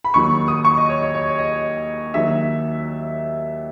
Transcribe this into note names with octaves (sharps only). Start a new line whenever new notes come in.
B5
D#2 D#3 F#3 C#6
D#6
C#6
D#5
C#5
C#5
C#5
D#5
D#2 D#3 F#3 E5